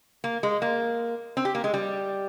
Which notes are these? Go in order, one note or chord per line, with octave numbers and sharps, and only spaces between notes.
A#3
G#3
A#3
C4
G4
A#3
G#3
G3